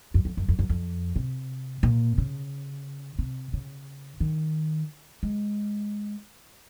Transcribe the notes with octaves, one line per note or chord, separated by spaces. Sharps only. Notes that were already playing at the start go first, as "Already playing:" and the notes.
F#2
F2
F#2
F2
F#2
F2
C3
A#2
C#3
C3
C#3
D#3
G#3